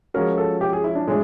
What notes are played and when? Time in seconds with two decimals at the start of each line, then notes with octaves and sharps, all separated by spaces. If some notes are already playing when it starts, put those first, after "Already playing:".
0.14 F3 G#3 C#4 F#4 A#4
0.38 A4
0.61 G4
0.73 G#4
0.84 E4
0.95 D4
1.07 A2 F#3 G#3 D4